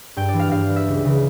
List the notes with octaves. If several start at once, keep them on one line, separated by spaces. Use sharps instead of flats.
G2 G5
E3 D5
F5
G2 F5
E3
E5
C#2
C#3 E3